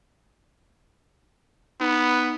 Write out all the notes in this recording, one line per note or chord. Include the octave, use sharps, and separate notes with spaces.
B3 D#4 B5